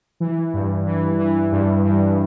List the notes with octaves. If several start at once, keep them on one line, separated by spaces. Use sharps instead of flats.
E3
G2
E3
E3
G2
G2